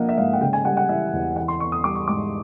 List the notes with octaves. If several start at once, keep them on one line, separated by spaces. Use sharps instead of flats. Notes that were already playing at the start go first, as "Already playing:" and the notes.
Already playing: F3 A#3 D4 D#5 F5 F#5
E5
G#2 F5
F#5
C#3 G5
G#5
G3 F#5
F#5
E3 E5
E2
E3 F#5
C6
B3 C#6
D#6
G3 D6
C#6
G#2 D6